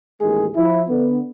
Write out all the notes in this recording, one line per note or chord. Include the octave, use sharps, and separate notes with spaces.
A1 D#2 D#3 G#3 G#4
F3 E4
D3 B3